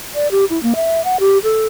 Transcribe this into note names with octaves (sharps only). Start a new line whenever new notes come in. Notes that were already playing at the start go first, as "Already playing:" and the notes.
D5
G4
E4
A#3
E5
F#5
G4
A4